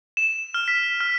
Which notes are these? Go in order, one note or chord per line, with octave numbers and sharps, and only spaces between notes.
E7
F6
B6
F6